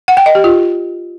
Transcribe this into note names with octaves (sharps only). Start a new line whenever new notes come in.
F#5
G5
D#5
G4
F4